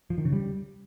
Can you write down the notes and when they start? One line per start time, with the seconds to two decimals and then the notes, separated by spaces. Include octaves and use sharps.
0.10 F3
0.18 D#3
0.25 C#3
0.33 G3